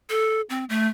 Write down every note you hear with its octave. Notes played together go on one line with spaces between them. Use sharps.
A4
C4
A3